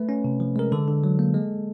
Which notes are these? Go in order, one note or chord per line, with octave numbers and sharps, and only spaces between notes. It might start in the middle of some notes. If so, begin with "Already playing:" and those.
Already playing: A3 B4
C#4
C3
F3
G#3 A#4
D3 A4
D3
F#3
A#3
G#3